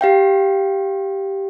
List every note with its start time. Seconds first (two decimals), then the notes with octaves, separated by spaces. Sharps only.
0.01 G4 F5 G5